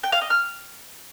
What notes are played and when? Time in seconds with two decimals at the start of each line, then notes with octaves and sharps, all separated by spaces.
0.03 G5
0.12 F5
0.21 D#5
0.30 F6